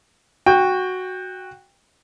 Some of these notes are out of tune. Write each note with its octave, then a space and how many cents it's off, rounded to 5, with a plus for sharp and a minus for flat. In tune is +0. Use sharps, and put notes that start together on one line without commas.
F#4 +0 G5 +20